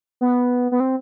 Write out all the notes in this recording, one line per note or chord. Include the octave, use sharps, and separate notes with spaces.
B3
B3
C4